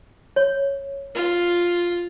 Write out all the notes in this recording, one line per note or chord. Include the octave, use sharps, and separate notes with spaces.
C#5
F4